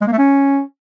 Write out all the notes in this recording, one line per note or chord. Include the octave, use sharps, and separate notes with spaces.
G#3
A#3
A3
C#4